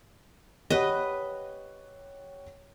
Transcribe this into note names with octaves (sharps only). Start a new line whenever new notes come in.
G4 B4 C#5 D#5 F#5